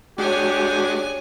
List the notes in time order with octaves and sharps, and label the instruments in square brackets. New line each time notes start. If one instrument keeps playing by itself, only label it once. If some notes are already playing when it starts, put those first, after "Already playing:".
[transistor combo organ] G#3 D4 F#4 [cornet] G4 [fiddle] C#5 G#5